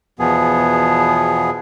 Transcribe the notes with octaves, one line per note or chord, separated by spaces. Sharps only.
E2 B2 F3 B3 G#4